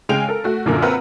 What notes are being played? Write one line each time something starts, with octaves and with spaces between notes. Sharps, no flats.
C#3 G#3 G5 G#5 D7 F7
A4 A#4
A3 F#4
A#1 F#2 A#2 D3 A#4 F6
C4 A#4 B4 E5 F#5 A#5